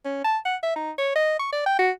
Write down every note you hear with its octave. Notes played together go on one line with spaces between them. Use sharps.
C#4
A5
F#5
E5
D#4
C#5
D#5
C#6
D5
G5
F#4